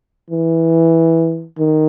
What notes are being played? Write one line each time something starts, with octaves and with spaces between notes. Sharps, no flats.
E3
D#3